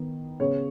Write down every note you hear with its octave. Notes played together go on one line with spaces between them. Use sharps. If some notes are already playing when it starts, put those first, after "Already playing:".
Already playing: D#3 B3
C#3 B3 C#5